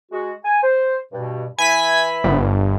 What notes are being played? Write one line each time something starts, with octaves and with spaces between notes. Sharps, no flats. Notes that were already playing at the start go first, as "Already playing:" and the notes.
G#3 F#4
G#5
C5
G2 B2
E3 E5 G#5 B5 B6
G1